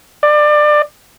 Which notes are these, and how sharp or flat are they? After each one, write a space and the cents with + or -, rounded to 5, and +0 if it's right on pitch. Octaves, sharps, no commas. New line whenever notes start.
D5 +25